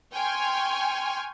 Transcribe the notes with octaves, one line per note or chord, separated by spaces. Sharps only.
G5 G#5 C6 C#6 F6